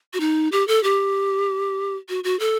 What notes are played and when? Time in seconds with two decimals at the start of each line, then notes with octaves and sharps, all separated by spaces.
0.14 F#4
0.20 D#4
0.52 G4
0.68 A4
0.84 G4
2.09 F#4
2.24 F#4
2.40 A4